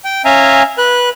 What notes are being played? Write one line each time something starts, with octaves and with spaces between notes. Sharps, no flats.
G5
C#4 E5 F5 G#5 A#5
B4 F#6